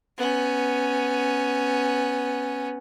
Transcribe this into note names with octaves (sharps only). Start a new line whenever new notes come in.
B3 C#4